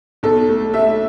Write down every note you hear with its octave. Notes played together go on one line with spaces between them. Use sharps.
B1 A4
A3
A3 E5